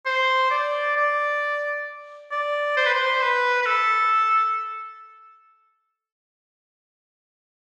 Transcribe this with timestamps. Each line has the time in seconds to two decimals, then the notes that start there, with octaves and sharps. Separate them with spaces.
0.06 C5
0.51 D5
0.96 D5
2.31 D5
2.77 C5
2.86 B4
2.94 C5
3.22 B4
3.62 B4
3.66 A4